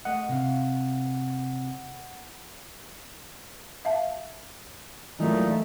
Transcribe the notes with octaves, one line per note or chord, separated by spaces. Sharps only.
A3 D#5 F#5
C3 F5
E5 F5 A5
A#2 E3 F#3 A3 D#4